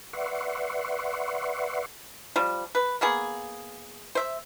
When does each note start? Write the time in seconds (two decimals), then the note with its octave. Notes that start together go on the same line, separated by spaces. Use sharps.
0.13 B4 D5 E5 F#5 C6 C#6
2.36 F3 G3
2.75 B4
3.01 A#3 B3 G#4
4.15 C5 E5